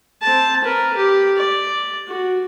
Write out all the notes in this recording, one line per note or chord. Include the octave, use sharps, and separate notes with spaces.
C4 A5
A#4 B4
G4
D5
F#4